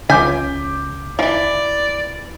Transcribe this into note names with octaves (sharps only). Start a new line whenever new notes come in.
C#2 C#3 G#5 D6 G6 B6
E3 F3 D5